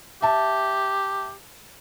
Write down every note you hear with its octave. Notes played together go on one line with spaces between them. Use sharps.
G4 E5 A5